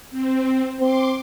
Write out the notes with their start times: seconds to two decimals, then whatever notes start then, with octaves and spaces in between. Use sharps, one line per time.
0.11 C4
0.80 C4 C6 D6